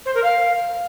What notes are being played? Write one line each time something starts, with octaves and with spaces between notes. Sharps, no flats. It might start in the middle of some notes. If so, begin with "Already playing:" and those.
C5
A#4
F5